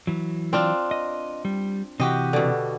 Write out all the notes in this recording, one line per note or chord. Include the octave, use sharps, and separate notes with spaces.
E3 F#3
C4 D4 F4
D#5
G3
C3 E3 F#4 G4 D#5
B2 D3